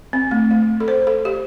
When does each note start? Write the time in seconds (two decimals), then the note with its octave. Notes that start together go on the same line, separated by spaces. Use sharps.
0.13 C4
0.31 A3
0.51 A3
0.80 A4
0.88 C5
1.07 A4
1.25 G4